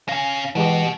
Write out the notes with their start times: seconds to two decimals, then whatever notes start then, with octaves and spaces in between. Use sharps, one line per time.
0.08 C#4 F5 G#5 A#6
0.55 B2 E3 G#3 F#4 G4